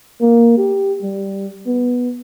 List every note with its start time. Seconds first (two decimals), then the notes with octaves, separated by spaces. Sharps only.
0.21 A#3
0.58 G4
1.02 G3
1.66 B3